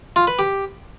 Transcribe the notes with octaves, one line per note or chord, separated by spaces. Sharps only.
F4
B4
G4